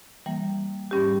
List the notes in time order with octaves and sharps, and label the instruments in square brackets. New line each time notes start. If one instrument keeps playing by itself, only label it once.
[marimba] E3 G3 A#3
G#2 G3 C#4 G4